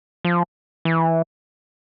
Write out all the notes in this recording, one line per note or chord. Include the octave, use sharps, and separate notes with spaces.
F3
E3